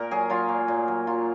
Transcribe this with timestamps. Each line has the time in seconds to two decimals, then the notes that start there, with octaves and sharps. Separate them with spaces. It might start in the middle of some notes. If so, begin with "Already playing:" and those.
Already playing: A#2 A#4
0.11 F#3 G#4
0.29 F#3 F4
0.49 A#2
0.68 A#2
0.88 F#3
1.07 F#3 F4